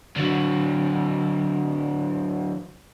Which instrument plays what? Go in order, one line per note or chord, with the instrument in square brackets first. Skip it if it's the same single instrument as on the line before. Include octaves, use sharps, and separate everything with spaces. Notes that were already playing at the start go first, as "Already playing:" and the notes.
[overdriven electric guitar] D3 F#3